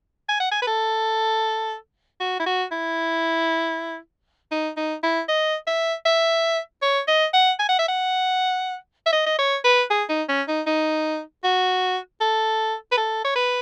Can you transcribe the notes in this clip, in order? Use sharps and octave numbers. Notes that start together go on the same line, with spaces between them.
G#5
F#5
G#5
B4
A4
F#4
E4
F#4
E4
D#4
D#4
E4
D#5
E5
E5
C#5
D#5
F#5
G#5
F#5
E5
F#5
E5
D#5
D#5
C#5
B4
G#4
D#4
C#4
D#4
D#4
F#4
A4
B4
A4
C#5
B4